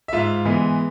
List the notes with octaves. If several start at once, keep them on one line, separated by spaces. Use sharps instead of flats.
E5
G#2 F4 F5
E3 G#3 B3